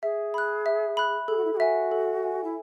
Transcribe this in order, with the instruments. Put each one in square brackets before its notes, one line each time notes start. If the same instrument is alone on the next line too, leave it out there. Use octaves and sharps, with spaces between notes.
[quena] G#4 [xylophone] E5
[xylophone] B5 F#6
E5
B5 F#6
[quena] G#4 [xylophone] A4
[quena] F#4
E4
G#4
[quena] F#4 [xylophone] E5 G#5
[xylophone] A4
E5 G#5
[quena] E4